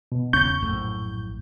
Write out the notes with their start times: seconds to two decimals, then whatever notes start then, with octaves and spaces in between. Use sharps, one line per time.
0.12 B2
0.33 E2 C#3 C#4 C#6 G6
0.61 A#1 F#2 A2